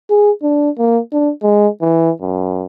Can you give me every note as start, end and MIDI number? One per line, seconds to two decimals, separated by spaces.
0.10 0.31 68
0.43 0.70 62
0.78 0.99 58
1.12 1.31 62
1.43 1.68 56
1.81 2.11 52
2.21 2.66 42